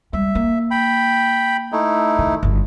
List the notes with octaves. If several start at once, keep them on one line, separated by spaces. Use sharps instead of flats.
G3 G#3 E5
A#3
G5 B5
A3 D#4 E4
D#3
G1 D2